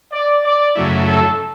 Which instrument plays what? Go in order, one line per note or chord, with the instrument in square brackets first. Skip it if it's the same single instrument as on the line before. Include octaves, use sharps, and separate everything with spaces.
[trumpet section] D5
D5
[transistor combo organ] F#2 C#3 F#3 A3 E4
[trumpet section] A4